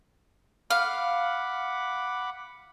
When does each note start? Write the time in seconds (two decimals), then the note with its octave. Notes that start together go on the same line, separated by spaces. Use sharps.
0.70 F5 F#5 B5 D6